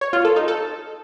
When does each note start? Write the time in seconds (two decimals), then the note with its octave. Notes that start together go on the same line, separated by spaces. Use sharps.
0.01 C#5
0.13 F4
0.25 A4
0.36 D#4
0.48 A4